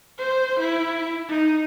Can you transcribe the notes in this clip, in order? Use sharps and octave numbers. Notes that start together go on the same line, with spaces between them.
C5
E4
D#4